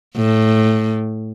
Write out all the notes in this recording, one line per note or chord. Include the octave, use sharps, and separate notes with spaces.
A2